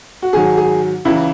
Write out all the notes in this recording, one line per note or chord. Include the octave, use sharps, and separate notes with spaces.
F#4
G#2 D#3 F#3 G#4
G#4
C#2 C#3 E3 E4